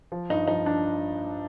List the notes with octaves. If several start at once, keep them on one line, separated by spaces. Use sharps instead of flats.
F3
G2 D#4
F3 D#4
D4